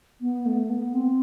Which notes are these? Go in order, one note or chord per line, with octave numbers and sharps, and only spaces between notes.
B3
A3
B3
C4